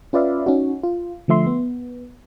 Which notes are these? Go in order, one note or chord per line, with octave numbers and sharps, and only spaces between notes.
C#4 F4 B4 D5 E5 F5
C#4 D#4 F#4
F4
D3 F3 A3 E5 C6
B3